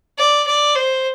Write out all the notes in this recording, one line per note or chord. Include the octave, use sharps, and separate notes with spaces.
D5
D5
C5